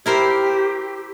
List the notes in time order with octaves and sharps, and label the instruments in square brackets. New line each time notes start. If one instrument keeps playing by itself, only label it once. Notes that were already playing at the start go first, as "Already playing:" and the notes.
[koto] E4 A#4 C5 [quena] G4